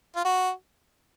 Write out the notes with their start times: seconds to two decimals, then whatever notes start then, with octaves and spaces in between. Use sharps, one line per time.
0.16 F4
0.25 F#4